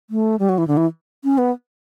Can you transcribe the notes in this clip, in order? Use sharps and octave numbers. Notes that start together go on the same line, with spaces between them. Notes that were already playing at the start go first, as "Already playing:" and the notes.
A3
G3
F#3
E3
D3
E3
C#4
B3